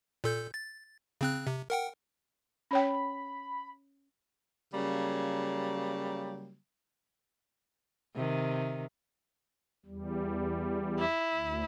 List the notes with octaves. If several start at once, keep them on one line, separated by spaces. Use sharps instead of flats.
A#2 A4 G6
A6
C#3 C4 F#6
C3
A#4 F#5 G5
C#4 C#5 G5 B5
C#3 F#3 G3 A#3
C3 D#3
E2 G3
E4
D2